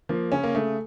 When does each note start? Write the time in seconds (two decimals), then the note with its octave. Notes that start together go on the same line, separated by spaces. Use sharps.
0.09 F3 A#3
0.32 C#3 C#4
0.43 A#3
0.55 C#3 A3